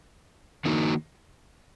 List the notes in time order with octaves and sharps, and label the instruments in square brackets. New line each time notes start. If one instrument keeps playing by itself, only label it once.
[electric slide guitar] D#3 A#3 D#4 F#4